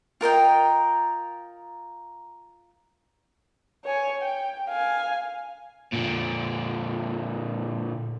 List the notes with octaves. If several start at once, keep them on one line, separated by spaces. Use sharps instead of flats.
F4 A#4 D#5 G5
C#5 G#5
G5
F5 G#5
A#2 D3